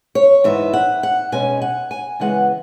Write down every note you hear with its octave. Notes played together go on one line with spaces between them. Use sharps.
C#5
G#2 E3 B3 E5
F#5
F#5
B2 G#3 C#4 G#5
F#5
G#5
C#3 E3 G#3 B3 F#5